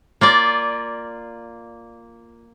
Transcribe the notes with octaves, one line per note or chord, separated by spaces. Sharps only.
A#3 F4 D5